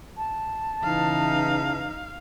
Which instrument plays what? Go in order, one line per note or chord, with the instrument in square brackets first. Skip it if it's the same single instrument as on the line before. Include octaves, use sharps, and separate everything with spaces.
[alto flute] A5
[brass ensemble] C#3 E3 [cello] D#4 [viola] F5